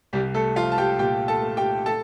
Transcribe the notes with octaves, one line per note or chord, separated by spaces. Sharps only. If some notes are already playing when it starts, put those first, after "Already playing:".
C2 G3 G4
A3 A4
F3 F4 F5
A5
G4 G5
A#2 G4 G5
A4 A5
A3
G4 G5
A4 A5